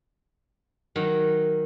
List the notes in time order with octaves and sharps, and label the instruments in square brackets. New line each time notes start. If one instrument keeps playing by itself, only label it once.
[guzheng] D#3 F#3